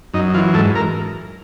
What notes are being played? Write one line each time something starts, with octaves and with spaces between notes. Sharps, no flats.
F#2 D#4
E3 F4
G#2 A4
A#4